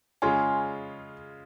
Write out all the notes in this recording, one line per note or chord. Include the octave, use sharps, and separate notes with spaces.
C#3 G#3 C#4 F4 G#5 C6